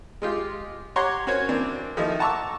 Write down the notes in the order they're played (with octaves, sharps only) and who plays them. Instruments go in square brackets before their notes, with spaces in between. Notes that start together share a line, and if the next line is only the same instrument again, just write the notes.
[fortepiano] G#3 F4 G4
G4 C#5 F#5 A#5 C6 C#6
C#4 F#4 A#4 C5 C#5
E3 A#3 C4 D4
D#3 F3 A3 A#3 D#4 E4
F#5 A5 A#5 C#6 D6 E6